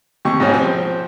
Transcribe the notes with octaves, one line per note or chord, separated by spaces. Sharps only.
D#2 C3 G4 C#6
G#2 B2 G3 C#4 F#4
F3 C4